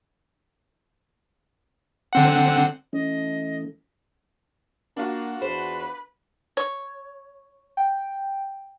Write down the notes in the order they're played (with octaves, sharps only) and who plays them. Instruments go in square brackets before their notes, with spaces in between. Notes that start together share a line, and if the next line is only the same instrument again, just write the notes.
[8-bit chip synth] D3 C4 F#5
[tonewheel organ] E3 A3 [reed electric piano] C#4 [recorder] D#5
[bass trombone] A#3 [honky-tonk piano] D4 F4 F#4
[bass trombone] E2 [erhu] B4 [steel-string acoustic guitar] C5
[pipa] C#5
[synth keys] G5